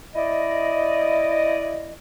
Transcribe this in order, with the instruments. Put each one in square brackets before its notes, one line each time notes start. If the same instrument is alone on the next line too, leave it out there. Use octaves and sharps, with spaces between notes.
[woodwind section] E4 D5 D#5